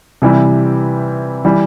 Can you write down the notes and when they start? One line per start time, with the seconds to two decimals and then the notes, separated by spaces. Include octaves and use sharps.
0.22 C3 E3 G3
1.45 E3 G3